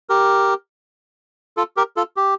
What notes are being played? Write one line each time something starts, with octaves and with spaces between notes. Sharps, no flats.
G4 A#4
F4 A4
G4 A#4
F4 A4
G4